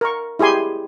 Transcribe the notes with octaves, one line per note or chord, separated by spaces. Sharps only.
A#4 C#6
E4 G4 G#4 G#5 C6